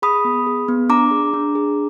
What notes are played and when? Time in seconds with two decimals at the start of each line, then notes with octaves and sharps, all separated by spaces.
0.02 G#4 B5 D#6
0.25 B3
0.46 G#4
0.68 B3
0.89 D4 A#5 D6
1.11 G#4
1.33 D4
1.55 G#4